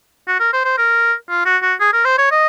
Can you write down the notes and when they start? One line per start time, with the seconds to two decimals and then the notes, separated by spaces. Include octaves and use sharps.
0.28 F#4
0.40 A#4
0.53 C5
0.65 C5
0.78 A#4
1.30 F4
1.46 F#4
1.63 F#4
1.80 G#4
1.93 A#4
2.05 C5
2.18 C#5
2.32 D#5